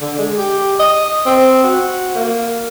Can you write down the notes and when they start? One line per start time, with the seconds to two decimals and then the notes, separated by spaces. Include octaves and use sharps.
0.01 D3
0.18 G#3
0.37 G4
0.79 D#5
1.26 C4
1.63 F#4
2.15 A#3